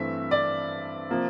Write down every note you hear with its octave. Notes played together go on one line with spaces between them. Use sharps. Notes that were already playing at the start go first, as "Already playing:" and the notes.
Already playing: G2 E3 A3 C4 E5
D5
C3 F3 A#3